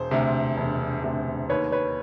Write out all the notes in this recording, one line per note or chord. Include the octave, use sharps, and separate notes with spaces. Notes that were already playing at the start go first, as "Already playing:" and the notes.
Already playing: E1 C5
D2 C3
E1
D2 C3
D#2 B4 C#5
B4 C#5